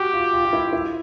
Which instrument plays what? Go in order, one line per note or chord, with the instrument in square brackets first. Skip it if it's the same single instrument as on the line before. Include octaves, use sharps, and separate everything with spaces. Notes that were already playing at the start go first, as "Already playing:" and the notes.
Already playing: [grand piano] F#4 [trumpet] G4
[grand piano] F4
F4
F4
E4
E4